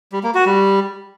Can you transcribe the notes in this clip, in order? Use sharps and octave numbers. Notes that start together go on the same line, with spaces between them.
G3
A#3
F#4
G3